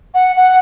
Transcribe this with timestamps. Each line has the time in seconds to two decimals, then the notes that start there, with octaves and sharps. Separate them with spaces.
0.14 F#5
0.36 F#5